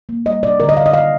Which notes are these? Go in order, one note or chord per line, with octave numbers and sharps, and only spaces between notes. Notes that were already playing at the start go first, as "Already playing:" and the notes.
A#3
G3 D#5
C3 D5
D3 A#4
D#5
D3 F5
D#5
D#3 F5